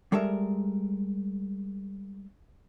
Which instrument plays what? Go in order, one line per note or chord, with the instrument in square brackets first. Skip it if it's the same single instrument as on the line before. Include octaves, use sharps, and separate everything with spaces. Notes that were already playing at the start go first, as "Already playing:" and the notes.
[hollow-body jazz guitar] G3 G#3 A4 A#4 E5